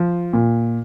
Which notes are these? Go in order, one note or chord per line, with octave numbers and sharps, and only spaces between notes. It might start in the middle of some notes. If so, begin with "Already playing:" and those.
Already playing: F3
A#2